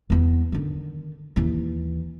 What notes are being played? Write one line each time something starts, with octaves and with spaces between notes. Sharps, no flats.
E2 B3
D3 D#3
D#2 E3